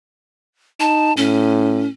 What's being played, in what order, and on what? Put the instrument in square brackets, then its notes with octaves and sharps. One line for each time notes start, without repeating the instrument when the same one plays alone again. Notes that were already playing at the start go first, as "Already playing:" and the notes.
[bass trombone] D#4 [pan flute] A5
[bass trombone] A2 [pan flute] C#4